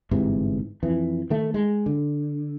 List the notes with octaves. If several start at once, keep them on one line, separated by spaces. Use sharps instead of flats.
G1 G#2 C3 E3
F2 E3
D#3 A3
G#3
D3